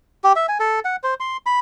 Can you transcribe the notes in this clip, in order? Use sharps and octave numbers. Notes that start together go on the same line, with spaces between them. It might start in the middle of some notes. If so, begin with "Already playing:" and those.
G4
E5
G#5
A4
F#5
C5
C6
B5